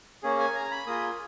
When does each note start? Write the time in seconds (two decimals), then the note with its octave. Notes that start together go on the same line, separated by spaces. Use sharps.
0.23 A#3 C#4 G#4
0.39 G#5
0.55 A#5
0.71 B5
0.87 A#3 F4 G#4 D#6